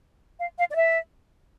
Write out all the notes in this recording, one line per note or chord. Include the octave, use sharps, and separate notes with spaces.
F5
F5
D5
E5